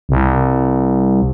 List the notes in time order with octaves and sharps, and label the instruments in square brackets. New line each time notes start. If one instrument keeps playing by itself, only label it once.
[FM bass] C2